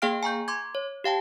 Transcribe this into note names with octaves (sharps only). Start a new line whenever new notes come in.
A#3 G#4 F5 G5 F6 D7
G#5 A#5 C#6 G6
C6 D6 G#6
C#5
G4 F5 G5 A5